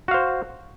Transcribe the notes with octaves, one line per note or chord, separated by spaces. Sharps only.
F#4 C5 F5